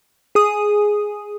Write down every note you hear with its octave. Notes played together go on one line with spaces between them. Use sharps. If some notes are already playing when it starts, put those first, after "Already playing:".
G#4 D#6